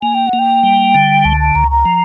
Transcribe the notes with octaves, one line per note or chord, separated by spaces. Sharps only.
A#3 G#5
G5
F#5
A#3
G5
G3
D3
C#2 A5
A5
C#2 A#5
A#5
F3